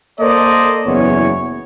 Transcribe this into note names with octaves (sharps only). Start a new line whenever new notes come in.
A#3 A4 A#4 C5 D5 D#5
F#1 E2 B3 C#5